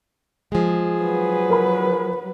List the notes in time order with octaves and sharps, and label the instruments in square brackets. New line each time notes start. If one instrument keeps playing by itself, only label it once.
[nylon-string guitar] F3 G#3 [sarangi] G#4
[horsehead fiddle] F#3 B4
[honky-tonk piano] A#4 B5